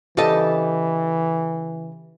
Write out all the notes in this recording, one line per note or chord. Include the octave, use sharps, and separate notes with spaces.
C#3 E3 G4 A4 D#5 A5